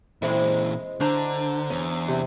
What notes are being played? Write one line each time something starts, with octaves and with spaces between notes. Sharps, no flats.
A#2 E3 G#3 C4 E4
D3 D4 C5 A#5
E2 C#4
C3